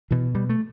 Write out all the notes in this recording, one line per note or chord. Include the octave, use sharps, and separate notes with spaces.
B2 E3
B2 G3
A3